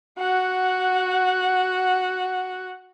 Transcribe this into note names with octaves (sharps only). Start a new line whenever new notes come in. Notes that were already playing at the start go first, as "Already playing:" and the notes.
F#4 F#5